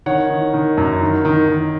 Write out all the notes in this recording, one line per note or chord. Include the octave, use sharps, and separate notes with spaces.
D#3 C#5 F#5
D#3
D#3
F#2
D#3
D#3
D#3